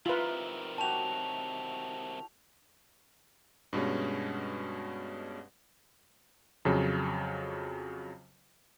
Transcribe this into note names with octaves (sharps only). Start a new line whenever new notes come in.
C3 D#3 E4 F4 A#4 B4
F#4 G4 C#5 A5 F7
G2 B2 G#3 C#4
F2 C#3 F#3